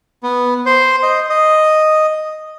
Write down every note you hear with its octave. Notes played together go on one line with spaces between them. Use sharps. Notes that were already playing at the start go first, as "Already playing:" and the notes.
B3
C5
D#5
D#5